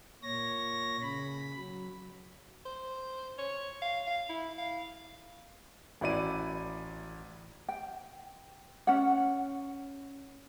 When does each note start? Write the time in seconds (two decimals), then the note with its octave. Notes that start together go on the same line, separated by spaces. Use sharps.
0.23 A#2 C#5 A#6
1.02 C#3 B5
1.56 F#3
2.65 C5
3.38 C#5
3.82 F5
4.07 F5
4.29 E4
4.58 F5
6.01 A1 E4 F#4 D5 D#7
7.69 G5
8.87 C#4 F#5